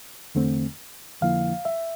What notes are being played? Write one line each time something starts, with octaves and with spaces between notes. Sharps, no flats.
E2 D3 A3 C4
F2 D3 F3 A#3 E4 F5
E5